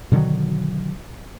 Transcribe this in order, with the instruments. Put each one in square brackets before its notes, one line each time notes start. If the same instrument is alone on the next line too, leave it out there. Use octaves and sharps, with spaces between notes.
[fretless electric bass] B2 D3 D#3 F#3